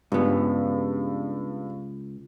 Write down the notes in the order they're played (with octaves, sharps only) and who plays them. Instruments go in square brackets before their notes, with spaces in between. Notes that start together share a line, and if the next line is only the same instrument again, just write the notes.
[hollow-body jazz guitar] C#2 B3 [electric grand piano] G2